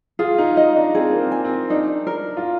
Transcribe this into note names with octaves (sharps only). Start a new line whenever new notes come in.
F4 G#4
D#4
D#4 D#5
D4
C4 G#4
A#3
C4
G#5
C4
D4 D#4
A#4
F4